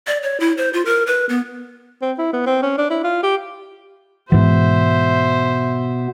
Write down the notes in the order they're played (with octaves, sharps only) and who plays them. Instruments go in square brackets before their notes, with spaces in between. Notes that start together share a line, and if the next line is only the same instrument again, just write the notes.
[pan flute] D5
C#5
E4
C5
F4
A#4
B4
B3
[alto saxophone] C4
E4
B3
C4
C#4
D4
E4
F4
G4
[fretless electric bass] G#2 E3 [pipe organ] B2 B3 [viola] C5 E5